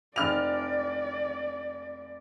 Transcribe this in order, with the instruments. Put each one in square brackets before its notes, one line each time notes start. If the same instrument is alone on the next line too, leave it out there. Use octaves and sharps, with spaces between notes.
[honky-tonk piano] F1 F6 F7 [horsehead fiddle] D5